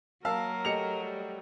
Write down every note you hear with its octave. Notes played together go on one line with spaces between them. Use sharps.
F#3 A#3 A#4 F5 A5 E6
A3 G4 D#5 C#7 F7
G3